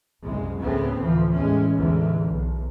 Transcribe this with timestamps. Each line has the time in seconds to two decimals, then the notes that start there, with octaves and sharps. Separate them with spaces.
0.23 F#1 C2 G#3
0.61 D2 A2 C#3 B3 C4
0.97 D2 A2 E3 F3
1.36 E2 A2 G#3 C#4
1.74 A1 E2 G#2 D3
2.30 B1